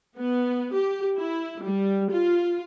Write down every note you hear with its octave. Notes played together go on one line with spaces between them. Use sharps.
B3
G4
E4
G3
F4